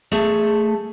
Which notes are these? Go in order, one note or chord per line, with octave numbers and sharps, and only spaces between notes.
A3 G#4 A4 E5